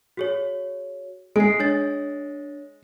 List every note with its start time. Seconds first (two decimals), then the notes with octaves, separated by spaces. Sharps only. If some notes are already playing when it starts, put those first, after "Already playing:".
0.17 F#4 G#4 C#5
1.36 G#3 C7 D7
1.60 D4 C#5 A6